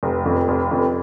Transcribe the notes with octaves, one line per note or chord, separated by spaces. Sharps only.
F1
F2
F1
F2